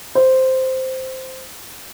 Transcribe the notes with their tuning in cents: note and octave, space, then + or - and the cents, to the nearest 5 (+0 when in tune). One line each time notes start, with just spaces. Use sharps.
C5 -5